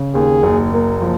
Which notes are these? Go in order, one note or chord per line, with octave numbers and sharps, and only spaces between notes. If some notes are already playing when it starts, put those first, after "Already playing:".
Already playing: C#3
D#2 G#4
F#1
A#3
F3